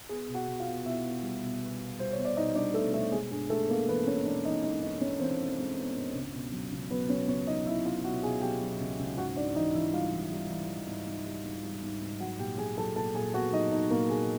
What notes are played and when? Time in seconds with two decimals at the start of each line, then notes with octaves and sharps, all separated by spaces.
0.09 B3 G#4 G#5
0.28 B2
0.34 F#4 F#5
0.47 B2
0.59 F4 F5
0.67 B3
0.85 B2 E4 E5
1.04 B3
1.22 G3
1.42 B2
1.61 B3
1.79 B3
1.99 G3 C5
2.12 C#5
2.18 B2
2.25 D5
2.36 B2 D#4 D#5
2.55 G3 D4 D5
2.74 B2 A3 A4
2.93 B2 A3 A4
3.12 G#3 G#4
3.31 G2 G#4
3.50 G#3 A3 A4
3.69 A#3 B3 A#4
3.88 E3 B3 B4
4.07 B3 C#4 C#5
4.25 G#3 D4 D5
4.45 E3 D#4 D#5
4.63 G#3 D#4 D#5
4.82 G2 D#4 D#5
5.01 G2 C#4 C#5
5.20 E3 C4 C5
5.40 E3
5.58 G#3
5.77 B3
5.96 G2
6.15 C#2
6.34 B2
6.52 F#3
6.72 C#2
6.90 F#3 B3 B4
7.09 F#3 C#4 C#5
7.28 C#2 C#4 C#5
7.47 F#3 D#4 D#5
7.66 F#3 E4 E5
7.85 F#3 F4 F5
8.04 B2 F#4 F#5
8.23 B2 G#4 G#5
8.41 F#3 G4 G5
8.61 F#3
8.80 C#2
8.99 C#2
9.17 G#2 F#4 F#5
9.36 G#2 D4 D5
9.55 E3 D#4 D#5
9.74 E3 E4 E5
9.93 G3 F4 F5
10.12 E3
10.31 G3
10.50 E3
10.68 E3
10.87 G#2
11.07 G#2
11.25 G3
11.44 G#2
11.64 G3
11.83 G#2
12.01 G#2
12.20 F#3 F#4 F#5
12.39 A#2 G4 G5
12.58 F#3 G#4 G#5
12.77 F#3 A4 A5
12.96 A#2 A4 A5
13.15 A#2 G#4 G#5
13.34 B3 F#4 F#5
13.53 F#3 D#4 D#5
13.72 F#3 D#4 D#5
13.90 A#2 A#3 A#4
14.10 A#2 G#4